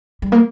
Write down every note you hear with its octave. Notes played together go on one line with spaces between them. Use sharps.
G3
A#3